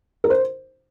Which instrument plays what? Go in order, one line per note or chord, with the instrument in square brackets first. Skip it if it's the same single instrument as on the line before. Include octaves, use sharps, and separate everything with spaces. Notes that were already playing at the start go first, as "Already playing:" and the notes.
[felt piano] A#4
C5